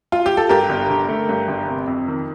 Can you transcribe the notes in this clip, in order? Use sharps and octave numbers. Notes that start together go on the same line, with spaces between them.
F4
G4
A4
G2 G4 A#4
G1
D3
A3
G2
G1
C3
F2
D#3